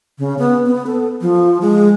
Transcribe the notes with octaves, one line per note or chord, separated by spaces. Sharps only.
C#3
B3
B3
A4
F3
G#3